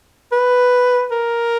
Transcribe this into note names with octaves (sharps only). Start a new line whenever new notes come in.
B4
A#4